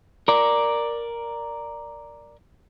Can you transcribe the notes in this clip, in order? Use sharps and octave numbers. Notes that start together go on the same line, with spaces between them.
A#4 D5